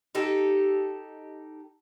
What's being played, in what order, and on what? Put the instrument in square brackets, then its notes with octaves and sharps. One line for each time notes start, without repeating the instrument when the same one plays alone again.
[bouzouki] D#4 G4 A4